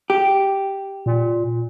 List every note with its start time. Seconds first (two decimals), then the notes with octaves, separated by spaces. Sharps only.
0.10 G4
1.06 A#2